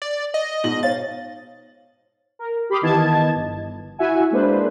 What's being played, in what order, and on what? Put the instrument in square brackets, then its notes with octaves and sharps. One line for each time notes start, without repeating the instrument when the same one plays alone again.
[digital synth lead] D5
D#5
[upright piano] G#2 B2 F#7
[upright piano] C5 C#5 F5 [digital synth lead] A6
[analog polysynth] A#4
G4 B5 C6 D6 D#6 F6
D#3 E3 B3 D#5 A5 G#6
G1
E4 F#4 E5 F#5 G#5
G#3 A#3 D4 B4 C5